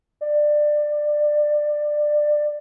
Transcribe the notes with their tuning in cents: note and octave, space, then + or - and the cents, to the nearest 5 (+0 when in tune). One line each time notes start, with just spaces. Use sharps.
D5 +20